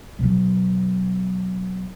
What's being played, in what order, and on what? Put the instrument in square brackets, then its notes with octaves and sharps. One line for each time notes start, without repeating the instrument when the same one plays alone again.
[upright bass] B2 F#3